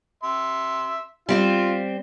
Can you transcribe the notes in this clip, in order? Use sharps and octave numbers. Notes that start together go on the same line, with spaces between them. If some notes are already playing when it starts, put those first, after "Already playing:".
E5 C6
G3 C4 F4 C5 F6